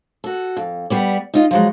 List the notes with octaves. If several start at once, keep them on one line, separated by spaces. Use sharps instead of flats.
F#4 A4
F2
G3 B3 D5
D#4 F4 D#5
F3 F#3 G#3